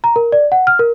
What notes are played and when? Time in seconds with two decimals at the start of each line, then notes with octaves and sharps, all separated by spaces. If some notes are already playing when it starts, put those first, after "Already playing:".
0.04 A#5
0.16 A#4
0.32 D5
0.52 F#5
0.67 F6
0.79 A#4